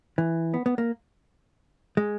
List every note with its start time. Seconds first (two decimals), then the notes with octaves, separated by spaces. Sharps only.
0.18 E3
0.54 B3
0.66 B3
0.78 A#3
1.97 G#3